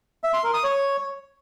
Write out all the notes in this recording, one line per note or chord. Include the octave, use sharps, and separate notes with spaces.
E5
C6
A#4
D#6
C#5